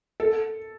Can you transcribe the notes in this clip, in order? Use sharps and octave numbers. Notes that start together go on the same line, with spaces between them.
A4